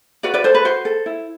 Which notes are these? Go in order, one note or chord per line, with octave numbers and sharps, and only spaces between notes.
F#4 B4 D5
B4 D5
A4 C5
B4
F#4 C5
A4
E4